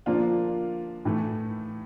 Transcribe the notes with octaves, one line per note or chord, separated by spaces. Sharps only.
D3 F3 A#3 D4 F4
A2 E3 A3